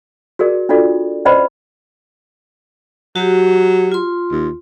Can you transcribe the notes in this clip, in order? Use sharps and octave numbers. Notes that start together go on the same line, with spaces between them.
F#4 G#4 A#4 D5
D4 F4 F#4 A4 D5
C#4 B4 C5 D5 D#5 B5
F#3 F#4 G4
F4 C6
D#2